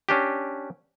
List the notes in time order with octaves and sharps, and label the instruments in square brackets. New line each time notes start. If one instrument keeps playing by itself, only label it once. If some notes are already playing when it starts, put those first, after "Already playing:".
[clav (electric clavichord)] C#4 D4 G4